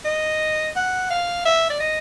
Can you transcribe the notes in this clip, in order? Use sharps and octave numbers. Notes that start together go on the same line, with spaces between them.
D#5
F#5
F5
E5
D5
D#5